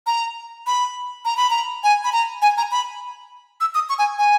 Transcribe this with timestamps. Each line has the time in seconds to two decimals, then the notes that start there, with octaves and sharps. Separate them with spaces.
0.07 A#5
0.67 B5
1.25 A#5
1.37 B5
1.50 A#5
1.84 G#5
2.04 B5
2.13 A#5
2.42 G#5
2.58 A#5
2.71 B5
3.61 E6
3.75 D#6
3.89 C#6
3.99 G#5
4.19 G#5